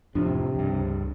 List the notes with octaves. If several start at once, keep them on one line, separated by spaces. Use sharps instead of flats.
F2 A2 C3 F3 D4
C#2 G2